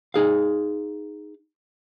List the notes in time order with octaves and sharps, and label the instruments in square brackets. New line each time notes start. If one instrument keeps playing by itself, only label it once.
[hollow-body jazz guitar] D#4 G#4 F5